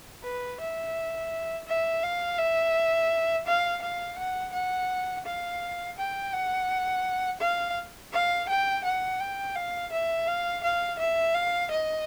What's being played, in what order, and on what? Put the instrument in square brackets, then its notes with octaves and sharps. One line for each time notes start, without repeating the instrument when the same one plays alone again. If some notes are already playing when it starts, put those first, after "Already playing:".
[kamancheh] B4
E5
E5
F5
E5
F5
F5
F#5
F#5
F5
G5
F#5
F5
F5
G5
F#5
G5
F5
E5
F5
F5
E5
F5
D#5